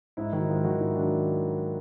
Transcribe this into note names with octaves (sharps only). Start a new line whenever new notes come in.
G#2 E4
D#3 F#3 E4
G#2 F4
D#3 F#3 F#4
G#2 E4
D#3 F#3 D4